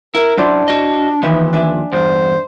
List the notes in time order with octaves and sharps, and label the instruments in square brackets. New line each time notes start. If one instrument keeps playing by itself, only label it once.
[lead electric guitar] E4 [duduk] A#4
[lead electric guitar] F#2 [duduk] D4 [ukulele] E4 C5 D5
[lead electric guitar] F#4 D#5
[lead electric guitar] D#2 F3 [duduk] E3 [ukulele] D#4 B4 E5
[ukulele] D4 E5 G#5
[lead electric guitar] E2 G2 [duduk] C5